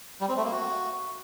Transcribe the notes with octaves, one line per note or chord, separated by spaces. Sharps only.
G3
C4
A3
A#3
F#4